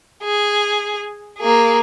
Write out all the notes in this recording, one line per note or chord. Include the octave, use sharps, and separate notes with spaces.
G#4
A#3 G#4